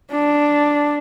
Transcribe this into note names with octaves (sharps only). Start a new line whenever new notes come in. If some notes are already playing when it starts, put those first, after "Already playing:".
D4